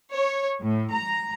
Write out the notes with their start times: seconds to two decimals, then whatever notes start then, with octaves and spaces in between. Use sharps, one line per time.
0.13 C#5
0.61 A2
0.94 A#5